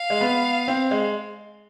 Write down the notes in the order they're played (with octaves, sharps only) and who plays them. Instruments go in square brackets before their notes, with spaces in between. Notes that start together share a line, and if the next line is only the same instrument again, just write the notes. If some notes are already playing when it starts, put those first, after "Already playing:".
Already playing: [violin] F5
[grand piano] G#3
B3
C4
G#3